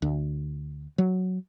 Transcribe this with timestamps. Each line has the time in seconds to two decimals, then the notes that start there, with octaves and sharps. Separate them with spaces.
0.02 D2
0.98 F#3